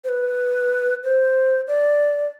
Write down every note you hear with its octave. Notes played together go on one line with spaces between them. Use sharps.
C5
B4
C5
D5